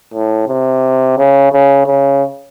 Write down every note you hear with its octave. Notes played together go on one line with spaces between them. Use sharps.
A2
C3
C#3
C#3
C#3